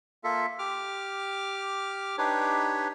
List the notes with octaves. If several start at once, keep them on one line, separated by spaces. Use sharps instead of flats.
A#3 F4 A4 E5
G4 D6 F6
D4 D#4 G4 B4 C#5